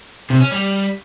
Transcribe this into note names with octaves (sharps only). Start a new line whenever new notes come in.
C3
C#4
G3